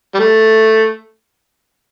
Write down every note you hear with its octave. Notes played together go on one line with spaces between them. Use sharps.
G3
A3